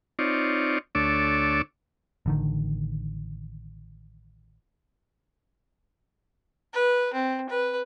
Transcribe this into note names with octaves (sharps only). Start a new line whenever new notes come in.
C4 D#4 F4 C#5 D5
D2 A3 D4 C#5 D6 E6
A1 D3 D#3
B4
C4
B4